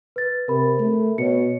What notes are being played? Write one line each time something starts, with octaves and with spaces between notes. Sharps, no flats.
B4 A6
C3 A#4 B5
A3
B2 C#5 C#7